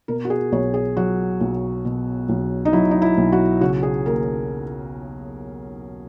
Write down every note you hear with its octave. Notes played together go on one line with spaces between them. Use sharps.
B2 A#4
F#4
G#4
B1 C#5
G#4
F#3 F#4
B1
B2
B1
D#4
F#3 E4
D#4
E4
B1
F#4
C#3 F#4
G#4
D#2 A#4